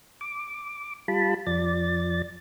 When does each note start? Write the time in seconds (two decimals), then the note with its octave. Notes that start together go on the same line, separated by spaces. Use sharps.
0.21 D6
1.08 G3 F4 A5 B5
1.46 F2 F3 D5 A6